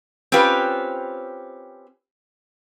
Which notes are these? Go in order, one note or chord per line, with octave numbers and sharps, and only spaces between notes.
C4 C#4 F4 G4 B4